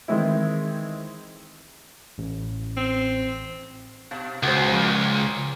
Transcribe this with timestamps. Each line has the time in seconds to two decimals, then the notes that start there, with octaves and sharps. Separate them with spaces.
0.08 D#3 E3 G#3 C4 E4
2.18 A1
2.77 C4
4.11 B2
4.43 C#2 F#4 G#4 C5
4.69 A#2 F3